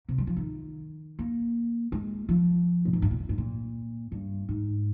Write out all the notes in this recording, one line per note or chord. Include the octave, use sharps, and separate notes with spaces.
C3
G3
F3
D#3
A#3
G#3
F3
A#2
G#2
G2
A#2
G2
G#2
A#2
G2
G#2